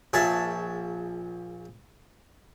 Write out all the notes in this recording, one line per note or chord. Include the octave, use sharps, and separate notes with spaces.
A#1 G#4 C#5 E5 A5